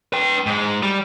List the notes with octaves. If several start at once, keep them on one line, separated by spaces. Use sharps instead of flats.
B4 G5
G#2 G#3
G3